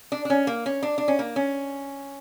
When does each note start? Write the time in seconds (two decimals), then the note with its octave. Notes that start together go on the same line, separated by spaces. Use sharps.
0.12 D4
0.25 D4
0.30 C#4
0.47 A#3
0.66 C#4
0.83 D4
0.98 D4
1.08 C#4
1.19 A#3
1.36 C#4